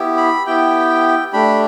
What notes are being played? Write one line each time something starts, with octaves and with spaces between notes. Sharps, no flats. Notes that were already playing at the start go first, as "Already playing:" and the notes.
Already playing: B3 E4 G4
B5
B3 E4 G4 G5
A3 D4 G4 B5